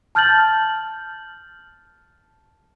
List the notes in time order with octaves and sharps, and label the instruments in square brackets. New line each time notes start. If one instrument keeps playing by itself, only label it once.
[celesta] A5 F6 G6 A6 F#7